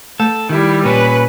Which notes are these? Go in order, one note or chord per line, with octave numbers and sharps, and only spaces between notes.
A3 A4
D#3 G3 E4
A#2 C#4 B4